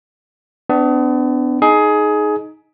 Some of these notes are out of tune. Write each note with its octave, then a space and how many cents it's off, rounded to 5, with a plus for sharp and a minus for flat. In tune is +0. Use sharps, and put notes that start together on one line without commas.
B3 +40 D4 +0
D#4 +0 G#4 +20